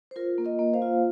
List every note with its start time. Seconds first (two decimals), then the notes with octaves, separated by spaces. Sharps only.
0.11 C5
0.16 F4 A#4
0.38 A#3
0.45 A#4 D#5
0.59 A#3
0.74 C5 F5
0.82 F4